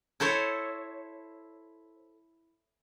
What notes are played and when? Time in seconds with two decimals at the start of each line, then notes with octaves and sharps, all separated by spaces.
0.20 E4 A4 C5 C#5